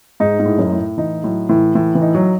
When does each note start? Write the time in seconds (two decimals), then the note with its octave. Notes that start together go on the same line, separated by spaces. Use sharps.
0.20 G#2 D#4
0.39 G#2
0.46 A2
0.58 F#2
0.72 A2
0.98 E3 D#4
1.23 A2 F#3
1.49 A2 E3
1.75 A2 E3
1.95 E3
2.02 D#4
2.15 F#3